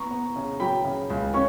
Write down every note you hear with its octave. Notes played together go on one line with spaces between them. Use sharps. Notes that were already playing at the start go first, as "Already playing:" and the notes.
Already playing: B3 A#5 C#6
B3
C#3
F#3 G5 B5
C#3
C#2
C#4 C#6